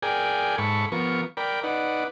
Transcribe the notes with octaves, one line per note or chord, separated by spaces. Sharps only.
G#4 A#4 D5 G5 G#5
G#2 A4 B5 C#6
F3 B3 A#4 C#6
A#4 D5 G5 B5
D#4 B4 D5 F#5